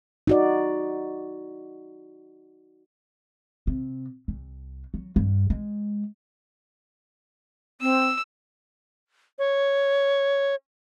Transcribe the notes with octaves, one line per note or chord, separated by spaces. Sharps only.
D#4 F#4 D5
C3
C2
F#3
G2
G#3
C4 E6
C#5